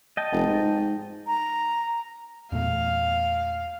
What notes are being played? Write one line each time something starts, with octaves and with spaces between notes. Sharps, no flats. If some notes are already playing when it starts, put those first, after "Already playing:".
D#5 G5 A5
F1
G#2
A#5
E2 A#2 A3 F5